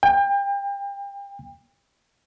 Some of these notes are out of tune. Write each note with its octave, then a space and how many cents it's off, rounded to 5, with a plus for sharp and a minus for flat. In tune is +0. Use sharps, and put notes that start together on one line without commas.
G5 +35